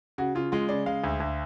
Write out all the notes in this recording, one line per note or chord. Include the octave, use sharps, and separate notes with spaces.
C#3 F#4
C#3 F4
G#3 F4
C#3 D5
G#3 F5
D2
D2